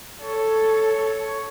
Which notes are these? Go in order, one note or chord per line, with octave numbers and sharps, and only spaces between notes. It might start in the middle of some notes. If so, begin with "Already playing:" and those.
A4 C#5